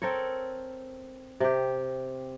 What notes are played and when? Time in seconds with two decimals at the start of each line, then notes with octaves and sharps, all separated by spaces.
0.02 C4 A4 A#4 C#5
1.40 C3 G4